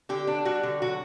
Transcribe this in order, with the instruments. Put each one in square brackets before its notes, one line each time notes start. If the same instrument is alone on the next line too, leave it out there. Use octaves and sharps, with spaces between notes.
[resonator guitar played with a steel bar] D3 G4
D4
G3 F#4
D3
F#3 F#4